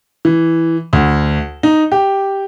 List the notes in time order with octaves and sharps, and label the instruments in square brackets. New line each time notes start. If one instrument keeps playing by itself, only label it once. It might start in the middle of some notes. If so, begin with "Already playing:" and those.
[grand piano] E3
D2
D#4
G4